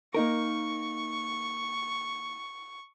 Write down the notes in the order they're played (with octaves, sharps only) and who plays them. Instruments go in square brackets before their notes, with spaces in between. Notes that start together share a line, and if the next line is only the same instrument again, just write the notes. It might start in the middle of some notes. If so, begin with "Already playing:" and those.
[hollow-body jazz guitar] A#3 D#4 A#4 [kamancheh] C#6